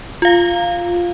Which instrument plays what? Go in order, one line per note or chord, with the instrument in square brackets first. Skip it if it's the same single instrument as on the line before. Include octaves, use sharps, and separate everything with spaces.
[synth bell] F4 F5